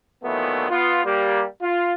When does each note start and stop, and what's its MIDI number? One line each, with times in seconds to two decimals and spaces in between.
0.24 0.69 46
0.24 0.69 51
0.24 0.69 52
0.24 0.69 54
0.24 0.69 57
0.24 0.69 59
0.69 1.05 59
0.69 1.05 65
1.05 1.45 55
1.05 1.45 58
1.05 1.45 67
1.62 1.93 65